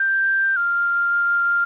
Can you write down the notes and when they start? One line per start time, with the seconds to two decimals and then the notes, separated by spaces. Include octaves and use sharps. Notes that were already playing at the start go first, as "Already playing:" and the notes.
Already playing: G6
0.56 F6